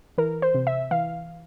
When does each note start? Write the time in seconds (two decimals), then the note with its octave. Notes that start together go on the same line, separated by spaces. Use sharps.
0.18 E3 A#4
0.42 C5
0.55 C3
0.67 E5
0.91 E3 F5